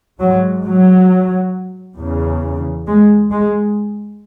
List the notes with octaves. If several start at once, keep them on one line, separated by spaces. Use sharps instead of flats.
G#2 F#3
F#3
E2 C#3
G#3
G#3